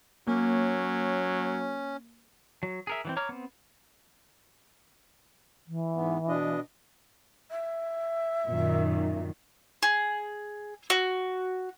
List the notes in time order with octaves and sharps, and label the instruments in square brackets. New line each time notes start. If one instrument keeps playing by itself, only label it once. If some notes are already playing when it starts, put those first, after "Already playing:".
[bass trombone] F#3 [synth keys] A#3 [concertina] C#4
[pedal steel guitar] F#3
G#4 A#4 E5
E3 F#3 C4
C#5 A#5 D6 F6
B3 C4
[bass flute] E3
[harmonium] G#2 B3
B2 D4 D#5
[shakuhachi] E5
[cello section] F#2 A#2 D#3
[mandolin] G#4
F#4